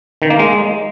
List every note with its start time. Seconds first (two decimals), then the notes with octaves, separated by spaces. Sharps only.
0.22 D#3
0.30 A#3
0.39 G#3